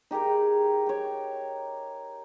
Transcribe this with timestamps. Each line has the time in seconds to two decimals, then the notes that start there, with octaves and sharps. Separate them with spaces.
0.11 D#4 G4 G#4 A#4
0.86 C#5 G5